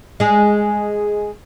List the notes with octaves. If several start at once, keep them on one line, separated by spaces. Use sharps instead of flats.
G#3 G#4